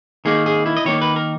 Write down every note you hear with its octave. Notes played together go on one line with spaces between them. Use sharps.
D#3 A#3 D#4 G#4
G#4
E4
D#5
D#3 A#3 D#4 C#5
B4
A#4